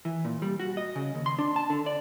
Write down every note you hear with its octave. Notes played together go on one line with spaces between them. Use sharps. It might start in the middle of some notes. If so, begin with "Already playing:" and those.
E3
A#2
G3
F#4
D#5
C#3
D#2
C6
D4
A5
D3
D5